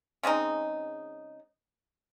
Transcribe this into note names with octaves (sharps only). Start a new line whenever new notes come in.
C#3 G#3 C4 D#4